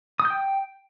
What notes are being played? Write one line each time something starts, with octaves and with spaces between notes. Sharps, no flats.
D#6
G6
G5